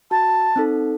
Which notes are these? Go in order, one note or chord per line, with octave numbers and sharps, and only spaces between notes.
F#4 A5
C4 D#4 A4